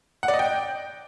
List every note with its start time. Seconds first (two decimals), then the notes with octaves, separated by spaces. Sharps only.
0.23 F#5
0.28 D5
0.34 D#5
0.39 G5